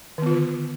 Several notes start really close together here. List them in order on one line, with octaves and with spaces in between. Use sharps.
D#3 B3 F4 D3